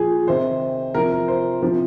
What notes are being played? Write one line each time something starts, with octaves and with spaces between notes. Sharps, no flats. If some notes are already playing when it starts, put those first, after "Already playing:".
Already playing: A#2 F3 G#4
C3 D#3 C5
C3 F3 A#4
A#4
C5
C3 F3